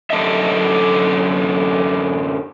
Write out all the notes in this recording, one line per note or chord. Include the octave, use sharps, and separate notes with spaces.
F#2 D3 D4 A4 D#5 E5